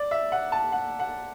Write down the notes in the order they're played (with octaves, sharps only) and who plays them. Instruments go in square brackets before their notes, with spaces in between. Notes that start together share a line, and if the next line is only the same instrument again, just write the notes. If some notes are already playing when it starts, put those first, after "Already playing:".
Already playing: [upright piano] D5
E5
F#5
A5
F#5
F#5